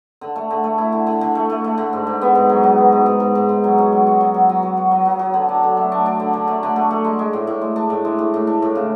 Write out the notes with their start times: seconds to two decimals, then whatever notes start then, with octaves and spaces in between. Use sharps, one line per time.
0.21 D3
0.36 A3
0.51 D3
0.64 A3
0.78 E4
0.92 D3
1.07 D3
1.21 D3
1.35 A3
1.50 A3
1.64 A3
1.78 D3
1.93 G#2
2.07 G#2
2.22 B3
2.35 G#2
2.49 F#3
2.63 F#3
2.78 B3
2.92 G#2
3.06 G#2
3.20 G#2
3.35 G#2
3.49 G#2
3.64 F#3
3.78 C#4
3.92 F#3
4.07 F#4
4.21 F#3
4.34 F#3
4.49 F#3
4.63 F#3
4.77 F#4
4.92 F#3
5.05 F#3
5.19 F#3
5.34 D3
5.49 D4
5.63 D3
5.77 A3
5.92 D4
6.06 D4
6.20 D3
6.33 D3
6.48 A3
6.63 D3
6.76 A3
6.90 A3
7.04 G#3
7.19 G#3
7.33 A2
7.47 A2
7.61 G#3
7.76 D4
7.90 A2
8.05 G#3
8.19 A2
8.34 A2
8.47 D4
8.62 A2
8.75 C#3